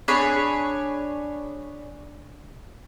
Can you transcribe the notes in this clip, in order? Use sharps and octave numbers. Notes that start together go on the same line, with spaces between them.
D4 G#4 C#5 B5